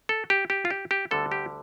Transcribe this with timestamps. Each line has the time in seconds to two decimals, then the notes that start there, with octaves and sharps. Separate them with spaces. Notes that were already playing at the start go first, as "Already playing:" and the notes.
0.09 A4
0.30 G4
0.50 G4
0.65 F4
0.70 G4
0.91 G4
1.11 D2 D3 G3 A4
1.32 G4